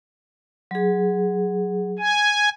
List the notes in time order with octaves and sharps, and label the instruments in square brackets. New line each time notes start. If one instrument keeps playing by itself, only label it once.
[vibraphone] F#3 G#4
[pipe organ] G#5